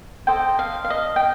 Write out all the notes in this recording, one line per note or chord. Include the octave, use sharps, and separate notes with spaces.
A4 C5 D#5 G5
F5
F5
D#5
G5